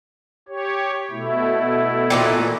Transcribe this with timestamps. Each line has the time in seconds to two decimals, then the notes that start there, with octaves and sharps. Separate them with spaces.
0.48 G4 C#5
1.11 B2 A3 E4
2.10 A#2 D#3 E3